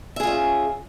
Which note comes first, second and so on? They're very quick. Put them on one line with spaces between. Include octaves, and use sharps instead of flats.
E5 G#4 F4 C#4